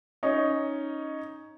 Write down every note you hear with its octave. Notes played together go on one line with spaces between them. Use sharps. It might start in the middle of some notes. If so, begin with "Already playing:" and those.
C#4 D#4